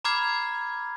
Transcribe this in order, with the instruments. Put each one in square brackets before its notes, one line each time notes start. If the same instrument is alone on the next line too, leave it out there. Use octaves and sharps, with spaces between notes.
[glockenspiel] A#5 B5 D6 F6 G#6 C7